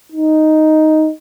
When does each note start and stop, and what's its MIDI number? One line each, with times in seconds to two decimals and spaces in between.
0.12 1.10 63